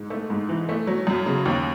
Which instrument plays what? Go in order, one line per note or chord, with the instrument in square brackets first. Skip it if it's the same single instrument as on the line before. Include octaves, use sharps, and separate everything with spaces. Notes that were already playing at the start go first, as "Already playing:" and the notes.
Already playing: [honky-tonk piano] G#2
A3
G#2
E3
A3
F#3
F#2
C#3
D#2